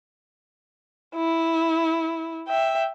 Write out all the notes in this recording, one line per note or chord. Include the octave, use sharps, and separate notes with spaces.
E4
E5 G5